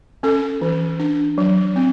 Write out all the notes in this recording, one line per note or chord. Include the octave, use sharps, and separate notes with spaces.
C#4 A4
E3
D4
F#3
C4